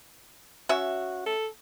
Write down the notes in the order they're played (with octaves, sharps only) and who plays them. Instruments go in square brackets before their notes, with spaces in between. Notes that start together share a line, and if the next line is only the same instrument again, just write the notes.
[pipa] C#4 E5 [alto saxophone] F#4
[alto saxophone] A4